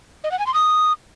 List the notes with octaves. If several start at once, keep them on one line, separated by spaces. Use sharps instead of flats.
D#5
F#5
G#5
C6
D#6